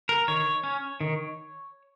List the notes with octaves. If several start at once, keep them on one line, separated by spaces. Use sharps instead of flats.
A#4
D#3 C#5
C#4
D#3